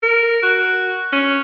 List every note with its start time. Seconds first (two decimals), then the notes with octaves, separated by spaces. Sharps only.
0.03 A#4
0.43 F#4
1.13 C#4